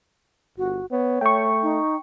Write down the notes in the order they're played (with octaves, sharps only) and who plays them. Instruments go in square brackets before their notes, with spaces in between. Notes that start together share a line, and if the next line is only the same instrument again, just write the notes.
[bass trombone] G1 [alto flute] F#4
[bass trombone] B3 [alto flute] C#5
[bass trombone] A3 [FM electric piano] G5 C#6
[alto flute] D#4